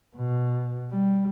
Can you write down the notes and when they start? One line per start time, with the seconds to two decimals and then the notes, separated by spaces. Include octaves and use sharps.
0.16 B2
0.91 G3